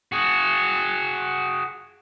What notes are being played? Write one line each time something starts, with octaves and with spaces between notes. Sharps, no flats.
F#4 G#4